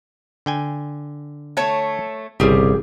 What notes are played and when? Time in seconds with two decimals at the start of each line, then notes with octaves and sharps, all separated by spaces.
0.46 D3 G5 G#5
1.57 A3 C#5 A5
2.40 G1 C2 C#3 G3 G4 G#4